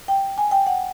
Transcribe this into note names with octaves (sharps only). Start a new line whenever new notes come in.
G5
G#5
G5
F#5